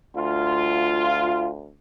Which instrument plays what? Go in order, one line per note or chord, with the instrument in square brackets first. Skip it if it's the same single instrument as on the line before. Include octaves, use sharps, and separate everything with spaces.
[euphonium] D2 [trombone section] F4